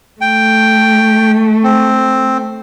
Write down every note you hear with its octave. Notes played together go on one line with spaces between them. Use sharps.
A3 G5
C4